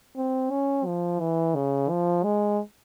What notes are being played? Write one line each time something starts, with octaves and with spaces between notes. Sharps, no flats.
C4
C#4
F3
E3
C#3
F3
G#3